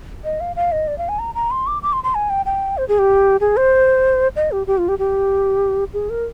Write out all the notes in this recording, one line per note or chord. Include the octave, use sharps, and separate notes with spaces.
D#5
F5
F5
D#5
D5
F5
G#5
A#5
A#5
C6
D6
D6
C6
C6
G#5
G5
G5
C5
G#4
G4
G#4
C5
D#5
G4
G4
F4
G4
G4
G#4
A#4